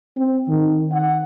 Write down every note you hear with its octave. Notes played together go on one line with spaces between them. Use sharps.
C4
D#3
F#5